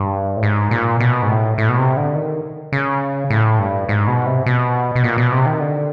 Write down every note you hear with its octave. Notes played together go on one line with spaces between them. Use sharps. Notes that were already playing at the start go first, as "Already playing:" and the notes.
Already playing: G2
A2
G#2
A#2
B2
G#2
A2
A2
B2
C3
D3
D#3
C#3
A2
G2
G#2
B2
C3
B2
B2
A#2
B2
C3
D#3
D3